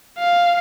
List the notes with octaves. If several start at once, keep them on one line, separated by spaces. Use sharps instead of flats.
F5